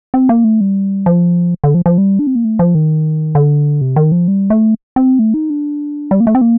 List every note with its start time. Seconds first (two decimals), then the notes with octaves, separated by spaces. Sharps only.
0.14 C4
0.29 A#3
0.44 A3
0.61 G3
1.06 F3
1.64 D3
1.74 F3
1.86 F3
1.98 G3
2.19 D4
2.27 C4
2.35 A#3
2.44 A3
2.59 F3
2.75 D#3
3.35 D3
3.81 C3
3.96 D#3
4.12 F3
4.28 G3
4.50 A3
4.96 C4
5.19 A3
5.34 D#4
5.50 D4
6.11 G3
6.20 A#3
6.27 A3
6.35 C4
6.41 A#3